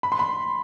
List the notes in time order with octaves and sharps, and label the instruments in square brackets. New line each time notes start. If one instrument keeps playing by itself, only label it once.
[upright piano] B5
C6
B5